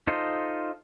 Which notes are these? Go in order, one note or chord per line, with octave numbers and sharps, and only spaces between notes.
D#4 F4 A4 C5 D#5